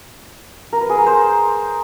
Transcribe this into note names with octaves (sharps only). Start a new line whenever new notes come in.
A#4
B4
G#4
A#4
C5